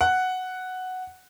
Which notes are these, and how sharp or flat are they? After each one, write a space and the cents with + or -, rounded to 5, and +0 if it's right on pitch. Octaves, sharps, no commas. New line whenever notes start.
F#5 +0